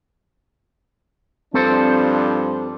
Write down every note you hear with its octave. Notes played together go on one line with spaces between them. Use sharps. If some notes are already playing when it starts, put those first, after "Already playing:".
G2 F3 C4 D4 A4 C5